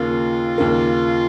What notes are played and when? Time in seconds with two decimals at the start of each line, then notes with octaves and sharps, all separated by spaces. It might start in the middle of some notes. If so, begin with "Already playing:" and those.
Already playing: D#2 C#3 A#3 F4
0.58 D#2 C#3 A#3